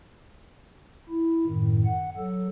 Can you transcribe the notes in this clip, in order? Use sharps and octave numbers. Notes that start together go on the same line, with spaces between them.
E4
F#2 A2 D#3
F#5
F#3 A4